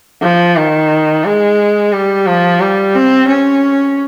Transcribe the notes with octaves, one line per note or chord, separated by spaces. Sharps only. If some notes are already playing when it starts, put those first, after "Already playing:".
F3
D#3
G#3
G3
F3
G3
C4
C#4